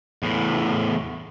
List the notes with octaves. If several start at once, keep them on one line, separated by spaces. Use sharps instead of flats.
E2 A2